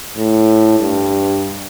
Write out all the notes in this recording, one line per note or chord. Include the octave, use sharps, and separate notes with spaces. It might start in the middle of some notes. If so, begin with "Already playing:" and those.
A2
G2